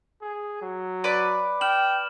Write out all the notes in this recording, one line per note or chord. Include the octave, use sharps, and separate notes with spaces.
G#4
F#3
B4 D5 D6
G5 F6 E7 F#7